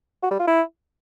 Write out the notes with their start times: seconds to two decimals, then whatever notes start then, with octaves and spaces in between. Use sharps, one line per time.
0.23 F#4
0.31 G3
0.39 F4
0.47 E4